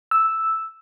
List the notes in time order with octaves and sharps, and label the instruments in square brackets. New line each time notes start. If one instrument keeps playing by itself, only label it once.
[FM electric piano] E6